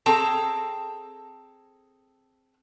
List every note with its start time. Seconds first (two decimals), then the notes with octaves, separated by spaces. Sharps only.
0.06 C4 G#4 A4 G5 A#5